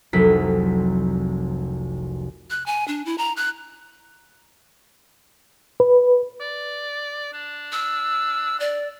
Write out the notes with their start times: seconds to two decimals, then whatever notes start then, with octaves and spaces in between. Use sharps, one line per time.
0.13 F1 C2 F#3 B6
2.50 F#6
2.66 G#5
2.88 D4
3.06 E4
3.18 A#5
3.37 F#6
5.80 B4
6.41 D5
7.33 D4
7.72 E6
8.60 D5